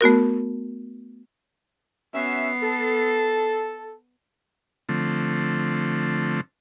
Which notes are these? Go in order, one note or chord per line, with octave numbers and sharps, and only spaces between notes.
A3 B3 F#4 A#4
B3 C#4 F#4 E5 C7
A4
D3 F3 A3 C4